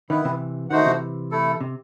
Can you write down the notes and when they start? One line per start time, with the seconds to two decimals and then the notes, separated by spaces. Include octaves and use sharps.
0.10 D#3 B3 E4 B4
0.25 C3 E3
0.70 D#3 A3 D#4 F#4 C5 F#5
0.86 C3 E3
1.31 A3 E4 A4
1.61 C3